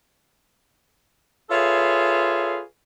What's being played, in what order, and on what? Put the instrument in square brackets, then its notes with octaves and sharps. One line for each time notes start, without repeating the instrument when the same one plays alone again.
[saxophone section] F4 G#4 A4 B4 C#5 E5